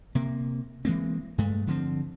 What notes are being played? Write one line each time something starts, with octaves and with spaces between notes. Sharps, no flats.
C3 A#3
E3 G#3 A#3 C4
G2 G#3 A3
D3 F3 G#3 C4